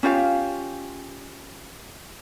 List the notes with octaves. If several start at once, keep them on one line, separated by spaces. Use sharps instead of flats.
C#4 F4 G4 F5